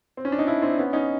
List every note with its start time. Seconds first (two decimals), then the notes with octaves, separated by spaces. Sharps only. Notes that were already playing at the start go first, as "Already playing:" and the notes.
0.17 C4
0.25 C#4
0.32 D4
0.39 D#4
0.47 D4 E4
0.62 C4 D4
0.78 B3 C#4
0.93 C#4 D#4